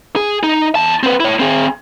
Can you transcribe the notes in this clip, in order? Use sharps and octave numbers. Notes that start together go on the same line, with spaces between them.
G#4
D#4
E2 A5
C4 B4
E4 C#5
C4 G#4